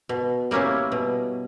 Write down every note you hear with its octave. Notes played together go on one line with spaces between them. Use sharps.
B2
G3 A#3 C#4 E4
B2